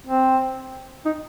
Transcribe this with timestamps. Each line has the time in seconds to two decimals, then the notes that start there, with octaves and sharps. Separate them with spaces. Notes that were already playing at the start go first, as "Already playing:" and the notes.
0.07 C4
1.06 D#4